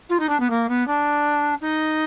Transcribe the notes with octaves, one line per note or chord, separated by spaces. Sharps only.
F4
D#4
D4
B3
A#3
B3
D4
D#4